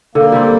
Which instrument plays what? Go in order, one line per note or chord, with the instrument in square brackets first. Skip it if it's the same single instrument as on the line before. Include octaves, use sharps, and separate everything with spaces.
[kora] D3 [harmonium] A#3
[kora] G3 C4